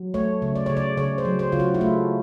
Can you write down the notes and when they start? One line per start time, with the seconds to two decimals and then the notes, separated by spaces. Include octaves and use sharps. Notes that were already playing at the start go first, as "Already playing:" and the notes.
Already playing: F#3
0.14 A3 C#5
0.42 C#3
0.56 D5
0.66 C#3 C#5
0.77 D5
0.97 C#3 C#5
1.18 C5
1.25 F#3
1.39 C5
1.52 C#3 F4
1.60 F#4
1.74 E4
1.81 A3 F4